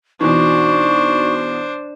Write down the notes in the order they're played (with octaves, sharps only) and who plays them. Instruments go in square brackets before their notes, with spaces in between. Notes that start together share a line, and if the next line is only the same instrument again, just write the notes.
[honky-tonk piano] E2 B2 E3 [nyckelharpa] D4 C5 [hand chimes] D#4 F#4 [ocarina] C#6